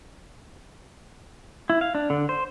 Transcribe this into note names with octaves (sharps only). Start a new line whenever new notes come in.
E4
F5
D4
D3
C5